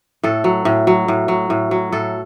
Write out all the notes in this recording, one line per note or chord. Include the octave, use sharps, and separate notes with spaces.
A2 A4
F#3
A2
F#3
A2
F#3
A2
F#3
A2 A4